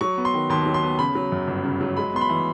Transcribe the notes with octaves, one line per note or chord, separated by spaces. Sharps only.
F#3 C#6
B3
C6
D#3
D#2 C6
F#3
C6
B3
C#3 B5
F#3
F#2
G1
C#3
F#3
G#3 B5
B3 C6
B5
E3